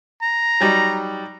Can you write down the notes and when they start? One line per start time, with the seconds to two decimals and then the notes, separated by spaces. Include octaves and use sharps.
0.22 A#5
0.60 F#3 G3 D#4